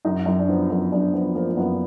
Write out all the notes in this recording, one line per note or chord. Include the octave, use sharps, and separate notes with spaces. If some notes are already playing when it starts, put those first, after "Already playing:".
F#2 D#4
F#2
D4
F3 B3
F#2 B3
F#2 D4
F3 B3
F3 A#3
A#3
F#2 B3